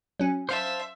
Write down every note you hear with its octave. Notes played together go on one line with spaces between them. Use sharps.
F#3 C#4
C5 E5 F5 A5